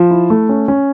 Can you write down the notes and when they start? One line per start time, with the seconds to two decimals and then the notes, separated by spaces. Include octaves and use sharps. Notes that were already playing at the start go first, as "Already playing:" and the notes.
Already playing: F3
0.11 E4
0.30 A3
0.49 C#4
0.68 C#4